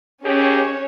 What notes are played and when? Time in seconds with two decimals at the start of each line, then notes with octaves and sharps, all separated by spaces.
0.24 D#2 C#4 G4 G#4 C#5